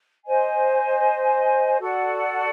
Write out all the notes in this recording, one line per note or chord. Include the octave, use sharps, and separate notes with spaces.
C5 D#5 G#5
F#4 A4 D5 F#5